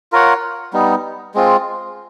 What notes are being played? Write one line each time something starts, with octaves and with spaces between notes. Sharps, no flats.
F4 A#4 C#5 F#5
G3 B3 D#4
G#3 C4 F4